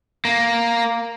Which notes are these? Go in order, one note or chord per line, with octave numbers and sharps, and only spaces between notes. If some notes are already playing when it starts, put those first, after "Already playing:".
A#3